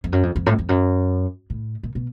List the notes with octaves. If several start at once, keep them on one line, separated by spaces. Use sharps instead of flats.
F2
F#2
F2
F2
A2
F2
F#2
A2
A#2
B2